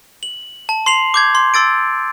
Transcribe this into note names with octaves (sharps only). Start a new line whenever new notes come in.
F#7
A5
C6 C7 F7 F#7
D6 G6 G#6
C6
C6 E6 A6 D7